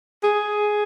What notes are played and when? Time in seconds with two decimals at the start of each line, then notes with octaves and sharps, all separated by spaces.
0.23 G#4